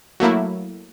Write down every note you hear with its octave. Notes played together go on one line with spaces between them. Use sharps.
F#3 A3 A#3 E4